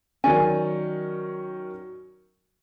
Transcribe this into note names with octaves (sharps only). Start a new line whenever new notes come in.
D#3 F#3 C#4 D5 G#5